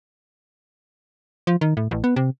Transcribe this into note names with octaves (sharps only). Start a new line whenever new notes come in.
F3
D#3
A2
A1
B3
C3